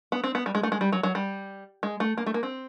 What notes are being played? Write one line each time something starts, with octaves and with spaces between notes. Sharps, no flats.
B3
C4
B3
G3
G#3
A3
G#3
G3
F#3
F#3
G3
G#3
A3
A#3
A3
A#3
C4